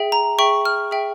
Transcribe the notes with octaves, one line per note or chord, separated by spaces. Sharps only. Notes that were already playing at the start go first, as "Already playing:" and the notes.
Already playing: G#4 E5 G5
A#5
G#4 E5 G5 C#6
F6
G#4 E5 G5